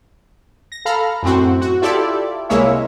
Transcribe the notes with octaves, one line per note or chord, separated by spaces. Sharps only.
A#6
A4 F5 A#5 B5 F6
F#2 A2 C4 F#4
F#4
E4 F4 G4 A4 D5 E5
C2 G#3 A#3 E4 C#5 E5